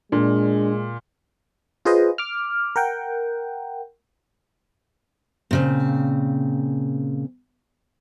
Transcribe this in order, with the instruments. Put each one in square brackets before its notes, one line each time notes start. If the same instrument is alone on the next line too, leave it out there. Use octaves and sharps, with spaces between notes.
[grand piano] A#2 [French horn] G#3 [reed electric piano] D4
[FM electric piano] F4 G#4 B4 C5 D#5
D6 F6
A#4 F#5 G5
[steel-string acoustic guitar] A#2 C#3 C4